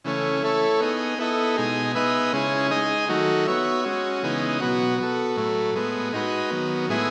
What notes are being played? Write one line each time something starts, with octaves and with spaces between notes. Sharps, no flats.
C#3 E3 A3 C#4
A3 E4 A4 C#5
B3 D#4 G#4
B3 E4 A4 D#5
B2 G#3 D#4 G#4
B3 D#4 G#4 B4 E5
C#3 G#3 C#4 E4 G#4
G#3 D#4 G#4 D#5
D#3 F#3 A3 D#4 F#4
B3 F#4 C#5 E5
G#3 C#4 F#4
C#3 E3 G#3 B3 D#4
B2 F#3 B3 F#4
B3 F#4 A4
A2 F#3 A3
A2 G#3 B3
G#3 D#4 F#4 B4
D#3 F#3 B3
A2 G#3 B3 E4 G#4